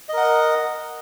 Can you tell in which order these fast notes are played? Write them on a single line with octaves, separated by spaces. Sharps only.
D#5 A#4 F#5